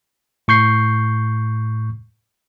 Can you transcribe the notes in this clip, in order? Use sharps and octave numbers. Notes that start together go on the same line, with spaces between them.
A2 C#6 G6 C7